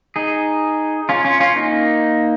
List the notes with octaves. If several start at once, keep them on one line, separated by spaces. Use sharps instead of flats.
D#4 G#4
C#4 F4
C#4 F4
C#4 F4
A#3 D#4